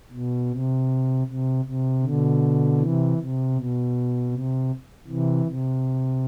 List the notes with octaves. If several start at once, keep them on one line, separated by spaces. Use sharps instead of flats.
B2
C3
C3
C3
B2 D3
C3 E3
C3
B2
C3
C3 E3
C3